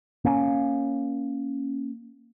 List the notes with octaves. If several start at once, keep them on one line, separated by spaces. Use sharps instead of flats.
A#3 C#4